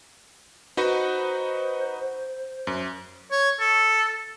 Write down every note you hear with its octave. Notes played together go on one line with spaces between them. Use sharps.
D#4 F#4 B4 C5
F#2
C#5
A4